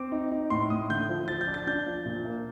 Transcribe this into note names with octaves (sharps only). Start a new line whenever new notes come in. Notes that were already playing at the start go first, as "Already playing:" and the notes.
Already playing: C4 D6
D#4
D#4
A2 C6
A2 D#6
D3 G6
F3
F3 A6
G6
D4
A6
D4 G6
F3
A#2
A#3